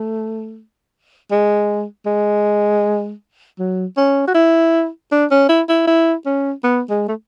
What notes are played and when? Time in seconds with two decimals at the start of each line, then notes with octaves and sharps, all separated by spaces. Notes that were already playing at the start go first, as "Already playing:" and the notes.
Already playing: A3
1.31 G#3
2.06 G#3
3.59 F#3
3.97 C#4
4.28 F#4
4.35 E4
5.12 D4
5.31 C#4
5.49 E4
5.69 E4
5.87 E4
6.26 C#4
6.64 B3
6.90 G#3
7.08 A3